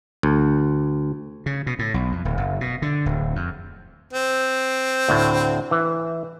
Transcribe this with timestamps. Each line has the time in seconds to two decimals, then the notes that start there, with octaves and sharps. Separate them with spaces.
0.23 D2
1.46 C#3
1.67 B2
1.79 A2
1.94 B1
2.12 F2
2.25 D1
2.37 F#1
2.61 B2
2.82 D3
3.06 D1
3.36 F2
4.13 C4
5.08 D2 A2
5.71 E3